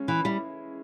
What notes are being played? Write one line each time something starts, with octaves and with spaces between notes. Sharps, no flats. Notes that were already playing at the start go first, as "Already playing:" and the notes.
Already playing: C#3 G#3 C#4
E3
G3 E4